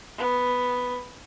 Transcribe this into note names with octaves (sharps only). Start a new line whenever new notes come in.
B3